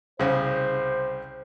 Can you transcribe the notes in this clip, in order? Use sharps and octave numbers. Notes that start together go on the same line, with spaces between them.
C2 C#3 C5